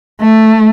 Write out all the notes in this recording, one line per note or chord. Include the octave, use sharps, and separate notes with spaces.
A3